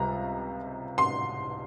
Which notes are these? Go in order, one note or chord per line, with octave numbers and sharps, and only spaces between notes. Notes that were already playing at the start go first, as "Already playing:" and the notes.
Already playing: C#2 C3 G3 A#5
C6